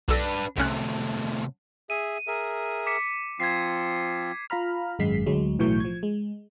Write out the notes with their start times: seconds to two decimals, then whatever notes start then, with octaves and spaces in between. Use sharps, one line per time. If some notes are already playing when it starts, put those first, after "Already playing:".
0.08 B1 D4 A4 B4 A#6
0.58 C2 A2 C3 C#4 F#6
1.90 G#4 E5 D#7
2.27 G#4 A#4 E5
2.87 D6 B6 C#7
3.40 F3 C4 F4 G#6 B6 C7
4.50 F4 F5 A#5 B5 F6
4.99 G#1 F#2 G#3 B6 C7
5.26 D2 F#3 G#3
5.59 B1 A2 E3 F#3 C#6 G6
5.80 F3 G#6
6.03 G#3